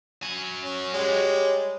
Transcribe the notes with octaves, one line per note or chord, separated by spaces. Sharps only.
F#4 G#5
C#4
G3 G#3 C#5